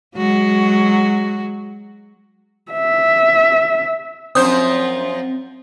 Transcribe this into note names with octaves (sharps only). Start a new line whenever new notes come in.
F#3 G#3 F#4
E5
F#2 F3 C4 C5 D#6 G6